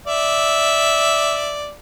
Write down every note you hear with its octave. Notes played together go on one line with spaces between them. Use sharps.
D5 E5